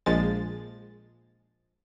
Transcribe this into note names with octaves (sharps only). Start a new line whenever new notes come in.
A#1 F3 G#3 A6